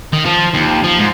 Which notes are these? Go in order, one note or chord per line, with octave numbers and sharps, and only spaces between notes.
D#3
F3
D#2
F3
G#2